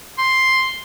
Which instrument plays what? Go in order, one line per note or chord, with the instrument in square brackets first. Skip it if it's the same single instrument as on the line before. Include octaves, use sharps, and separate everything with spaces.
[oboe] C6